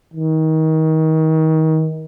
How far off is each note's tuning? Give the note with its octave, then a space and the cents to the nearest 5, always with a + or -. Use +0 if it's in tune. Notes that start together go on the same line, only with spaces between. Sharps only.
D#3 +30